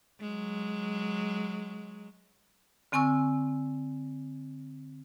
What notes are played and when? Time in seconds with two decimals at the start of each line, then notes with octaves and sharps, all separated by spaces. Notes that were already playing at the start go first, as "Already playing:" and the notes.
0.21 F#3 G#3
2.92 D3 C4 G#5 C#6 E6